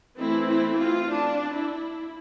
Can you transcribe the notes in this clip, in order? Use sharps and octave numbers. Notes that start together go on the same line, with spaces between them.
E3 A3 C4 E4
E4
F4
D4
E4